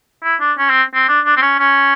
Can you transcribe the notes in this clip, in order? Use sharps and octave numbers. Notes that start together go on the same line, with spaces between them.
E4
D4
C#4
C4
C4
D4
D4
C4
C#4
C#4